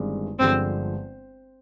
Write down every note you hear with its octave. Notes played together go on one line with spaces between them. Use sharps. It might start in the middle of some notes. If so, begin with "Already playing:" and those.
Already playing: G1 G2 D#3 G#3 C4
G1 G2 D3 F3 G#3 C4